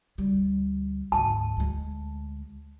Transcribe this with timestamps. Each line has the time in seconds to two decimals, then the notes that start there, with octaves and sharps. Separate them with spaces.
0.18 D2 G3
1.12 D2 G#2 A5
1.57 D2 G#3